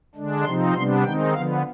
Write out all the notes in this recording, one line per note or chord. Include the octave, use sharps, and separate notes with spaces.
D3 G#3 D4
C3 F3 C4 D#4 C6
C3 G3 B3 D4 C6
D#3 G#3 C4 D#4 G5
D3 F3 B3 F5